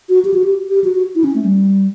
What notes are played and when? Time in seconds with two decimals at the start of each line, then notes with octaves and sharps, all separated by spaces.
0.09 F#4
0.25 G4
0.34 F#4
0.44 G4
0.69 G4
0.84 F#4
0.95 F#4
1.15 E4
1.24 C#4
1.35 A3
1.45 G3